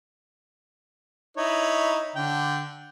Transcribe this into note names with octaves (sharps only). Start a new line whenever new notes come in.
D#4 E4 C#5
D3 G5